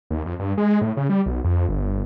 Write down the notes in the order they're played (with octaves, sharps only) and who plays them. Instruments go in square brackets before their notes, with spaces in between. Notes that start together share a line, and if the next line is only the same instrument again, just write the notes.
[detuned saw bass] D#2
F2
G2
G#3
A2
C#3
G3
B1
F2
G1